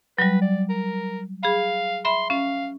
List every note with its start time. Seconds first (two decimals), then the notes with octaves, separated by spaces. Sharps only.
0.19 F#3 G3 B4
0.42 D5
0.69 A#4
1.43 G#4 F5 B5
2.05 E5 B5 C6
2.30 C#4 F5